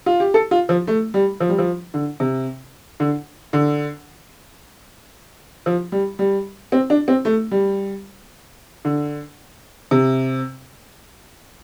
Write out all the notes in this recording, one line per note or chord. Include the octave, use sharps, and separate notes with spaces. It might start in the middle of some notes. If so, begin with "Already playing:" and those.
F4
G4
A4
F4
F3
A3
G3
F3
G3
F3
D3
C3
D3
D3
F3
G3
G3
C4
D4
C4
A3
G3
D3
C3